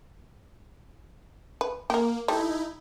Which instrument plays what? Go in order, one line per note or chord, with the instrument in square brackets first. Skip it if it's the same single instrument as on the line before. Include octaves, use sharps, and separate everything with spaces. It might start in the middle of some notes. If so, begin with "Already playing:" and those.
[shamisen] B4
[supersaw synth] A#3 [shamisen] G4 A#4
[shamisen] G3 A3 [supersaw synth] D#4 E4